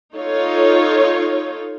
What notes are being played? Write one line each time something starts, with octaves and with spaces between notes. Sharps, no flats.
D#4 F4 A4 C#5